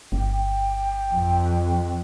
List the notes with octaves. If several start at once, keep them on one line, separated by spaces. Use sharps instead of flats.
G1 G5
F2